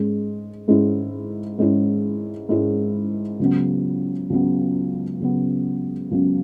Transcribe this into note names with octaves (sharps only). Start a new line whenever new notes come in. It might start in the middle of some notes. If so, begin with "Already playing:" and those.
Already playing: G#2 G#3 C#4
G#2 G#3 C#4 E4
G#2 G#3 C#4 E4
G#2 G#3 C#4 E4
C#2 C#3 F#3 B3
C#2 C#3 F#3 B3
C#2 C#3 F#3 B3
C#2 C#3 F#3 B3